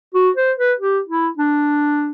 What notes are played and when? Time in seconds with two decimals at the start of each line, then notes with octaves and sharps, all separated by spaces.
0.15 F#4
0.37 C5
0.58 B4
0.80 G4
1.09 E4
1.38 D4